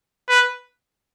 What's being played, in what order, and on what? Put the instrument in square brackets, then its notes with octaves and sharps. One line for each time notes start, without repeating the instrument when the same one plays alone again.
[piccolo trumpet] B4